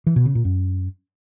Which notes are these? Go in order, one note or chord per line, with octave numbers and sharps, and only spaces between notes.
E3
B2
C#3
A#2
F#2